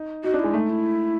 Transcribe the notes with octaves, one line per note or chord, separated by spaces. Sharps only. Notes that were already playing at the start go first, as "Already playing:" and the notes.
Already playing: D#4
D#4 F#4
D4
G#3 E4
A3 D#4
E4